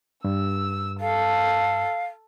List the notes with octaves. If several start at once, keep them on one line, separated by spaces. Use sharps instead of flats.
G2 E6
A4 F5